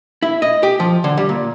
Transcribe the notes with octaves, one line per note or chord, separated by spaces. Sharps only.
E4
D#5
G4
F3
D3
G3
A#2